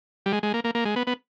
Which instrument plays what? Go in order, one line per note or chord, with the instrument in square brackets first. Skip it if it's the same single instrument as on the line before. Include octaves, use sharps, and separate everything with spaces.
[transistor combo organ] G3
G#3
G#3
A#3
A#3
A#3
G#3
B3
B3